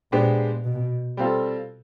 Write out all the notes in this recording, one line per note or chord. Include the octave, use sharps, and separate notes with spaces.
A#2 G#3 B3 D4 G4 C5
B2
G3 C4 F4 A4